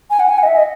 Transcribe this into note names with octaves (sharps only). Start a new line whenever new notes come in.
G#5
F#5
G#5
F#5
D#5
E5
D#5